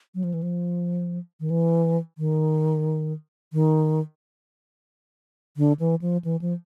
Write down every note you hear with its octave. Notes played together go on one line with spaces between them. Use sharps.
F#3
F3
E3
F3
D#3
E3
D#3
D#3
D3
E3
F3
E3
F3